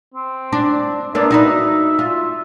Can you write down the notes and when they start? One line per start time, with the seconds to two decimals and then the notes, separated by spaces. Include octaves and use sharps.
0.14 C4
0.52 D4
1.15 A#3 B3 D4 E5
1.31 D#4 F#4 B4
1.99 F4